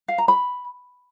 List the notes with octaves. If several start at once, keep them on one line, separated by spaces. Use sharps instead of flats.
F5
A#5
B5